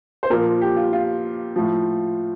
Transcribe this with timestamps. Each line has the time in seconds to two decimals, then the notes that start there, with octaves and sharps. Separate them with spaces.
0.23 C5
0.30 A#2 F3 A#4
0.61 G4
0.76 F4
0.93 F4
1.56 A2 F3